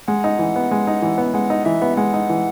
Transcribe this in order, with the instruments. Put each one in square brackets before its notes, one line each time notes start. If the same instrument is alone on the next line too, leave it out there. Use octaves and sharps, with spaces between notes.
[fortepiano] G#3 [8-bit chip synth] F#5
[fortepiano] D#4
E3
B3
G#3
D#4
E3
B3
[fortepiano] G#3 [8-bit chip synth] F#5
[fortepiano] D#4
[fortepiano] E3 [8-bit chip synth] E5
[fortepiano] B3
[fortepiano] G#3 [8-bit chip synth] F#5
[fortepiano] D#4
E3